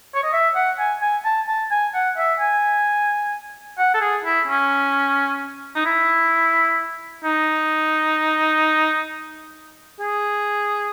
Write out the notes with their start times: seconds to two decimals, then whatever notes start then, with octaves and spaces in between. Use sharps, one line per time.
0.15 C#5
0.23 D#5
0.32 E5
0.55 F#5
0.78 G#5
1.01 G#5
1.24 A5
1.48 A5
1.71 G#5
1.94 F#5
2.17 E5
2.40 G#5
3.78 F#5
3.94 A4
4.01 G#4
4.24 E4
4.47 C#4
5.76 D#4
5.85 E4
7.24 D#4
10.00 G#4